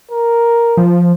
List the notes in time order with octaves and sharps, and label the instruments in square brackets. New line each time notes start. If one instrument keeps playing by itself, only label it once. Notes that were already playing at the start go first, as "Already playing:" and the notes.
[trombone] A#4
[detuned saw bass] F3